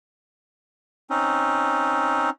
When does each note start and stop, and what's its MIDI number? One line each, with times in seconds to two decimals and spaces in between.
1.10 2.30 60
1.10 2.30 61
1.10 2.30 63